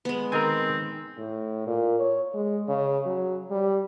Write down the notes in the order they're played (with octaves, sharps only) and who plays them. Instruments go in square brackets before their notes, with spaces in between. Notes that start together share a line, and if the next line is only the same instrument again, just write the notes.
[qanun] G#3 B3
[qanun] D#3 [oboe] C4 [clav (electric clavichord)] A#4 D#5 G#5
[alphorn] A2
A#2
C#5
G#3
C#3
F#3
G3